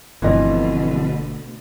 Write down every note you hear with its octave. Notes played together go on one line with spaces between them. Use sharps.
G1 F2 B2 D3 E3 A3 F4 D#5